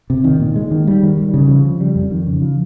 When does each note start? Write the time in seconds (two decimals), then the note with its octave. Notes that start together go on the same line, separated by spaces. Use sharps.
0.10 C3
0.24 D#3
0.40 A#2
0.56 G#3
0.71 D#3
0.87 G3
1.03 D#3
1.17 G3
1.34 C#3
1.49 F3
1.64 C#3
1.80 G3
1.96 F2
2.11 D#3
2.26 C#3
2.42 F3